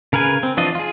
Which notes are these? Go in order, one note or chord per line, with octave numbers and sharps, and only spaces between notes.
C#3 A#4 B4 G#5
C4
E3 F3 D4 F4 D#5
F4 G#4